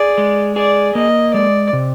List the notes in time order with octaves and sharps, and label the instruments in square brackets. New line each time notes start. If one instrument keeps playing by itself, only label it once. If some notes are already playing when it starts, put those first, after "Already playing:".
Already playing: [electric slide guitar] G#4 [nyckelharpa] D5
[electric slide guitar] G#3
[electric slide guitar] G#4 [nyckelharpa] D5
[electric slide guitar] A#3 [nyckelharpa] D#5
[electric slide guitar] G#3 [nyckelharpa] D5
[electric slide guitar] C3